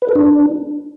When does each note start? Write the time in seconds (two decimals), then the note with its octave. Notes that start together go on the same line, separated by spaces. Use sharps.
0.02 B4
0.09 A4
0.15 D4